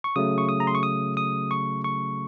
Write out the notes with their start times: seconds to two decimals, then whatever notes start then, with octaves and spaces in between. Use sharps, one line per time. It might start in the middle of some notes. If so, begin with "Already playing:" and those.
0.04 C#6
0.16 C#3 F#3 A3 D#6
0.38 C#6
0.49 D#6
0.60 A#5
0.67 C6
0.75 C#6
0.83 D#6
1.17 D#6
1.51 C#6
1.84 C#6